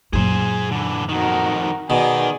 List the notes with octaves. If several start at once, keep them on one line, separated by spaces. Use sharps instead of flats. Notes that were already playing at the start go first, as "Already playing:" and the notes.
F#2 A#2 G#4 C5
D3 E3
F2 D#3 D#4 F#4 A#4
B2 D#3 G#4 D5